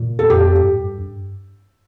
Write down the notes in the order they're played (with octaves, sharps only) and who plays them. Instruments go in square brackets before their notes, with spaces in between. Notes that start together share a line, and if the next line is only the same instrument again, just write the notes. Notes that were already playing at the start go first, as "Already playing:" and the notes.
Already playing: [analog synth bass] A#2
[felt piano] A4
[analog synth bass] F2 [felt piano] G4
[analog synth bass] A2
G2